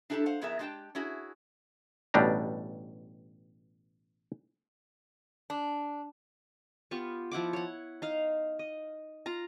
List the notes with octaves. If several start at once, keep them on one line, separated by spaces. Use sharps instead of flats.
D4 E4 G4 A4 G5 A5
C5 F5 F#5
F2 B3 E4 G#4 A#4 E5
G#3 D4 G4 F#5 G5 A5
C#4 E4 F#4 G#4
A1 B2 G3 D4 A#5
D4
B3 F4 G4 C#6
F3 E4 F#5 D6
C#5 F#5
D#4 F5
D#5
F4 A#5